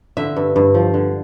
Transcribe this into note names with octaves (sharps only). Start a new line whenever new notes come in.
D3 E5
G2
G2
F3
D3